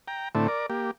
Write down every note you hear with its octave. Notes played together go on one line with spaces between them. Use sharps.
G5 A#5
A2 D3 A3 C4 E4
A#4 D5
A#3 G4